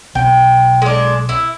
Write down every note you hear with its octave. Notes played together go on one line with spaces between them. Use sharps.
B1 G5
G#3 D4
E4